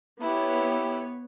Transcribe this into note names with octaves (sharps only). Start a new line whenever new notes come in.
B3 E4 G4 B4 C#5